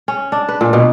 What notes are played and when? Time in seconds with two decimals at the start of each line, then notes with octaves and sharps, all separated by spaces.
0.08 C#4
0.32 D4
0.49 B4
0.61 A#2
0.73 B2